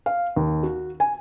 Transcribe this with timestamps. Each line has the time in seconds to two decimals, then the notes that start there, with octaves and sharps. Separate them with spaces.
0.06 F5
0.36 D#2
0.63 F#4
1.00 G#5